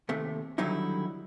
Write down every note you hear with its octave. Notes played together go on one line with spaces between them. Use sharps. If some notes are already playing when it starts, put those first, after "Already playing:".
D#2 C3 A3
D3 D#3 F#3 G3 D#4 E4